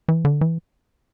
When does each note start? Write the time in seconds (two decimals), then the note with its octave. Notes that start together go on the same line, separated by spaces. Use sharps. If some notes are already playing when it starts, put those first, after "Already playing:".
0.08 E3
0.25 D3
0.41 E3